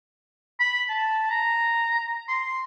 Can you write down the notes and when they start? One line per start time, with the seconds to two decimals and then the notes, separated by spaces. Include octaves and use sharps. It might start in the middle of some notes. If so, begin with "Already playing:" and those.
0.60 B5
0.89 A5
1.31 A#5
2.28 C6